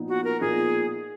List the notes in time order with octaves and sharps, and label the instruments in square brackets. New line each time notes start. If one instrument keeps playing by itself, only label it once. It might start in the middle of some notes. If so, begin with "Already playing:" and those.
Already playing: [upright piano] A#2 F3 B3 D#4
[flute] F#4
A#4
[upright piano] A#2 F3 B3 D#4 [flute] G#4